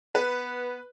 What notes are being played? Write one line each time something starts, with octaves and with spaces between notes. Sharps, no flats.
B3 B4